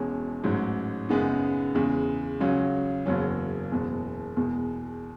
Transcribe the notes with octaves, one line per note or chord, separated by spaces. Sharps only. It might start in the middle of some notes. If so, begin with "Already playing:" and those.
Already playing: E1 E2 B2 G#3 C#4
A1 G#2 F#3
F#2 C#3 G#3 B3 D#4
E2 C#3 G#3
C#2 C#3 F#3 C#4
F#1 E2 C#3 F#3 C#4
F#1 E2 B2 G#3
E2 B2 G#3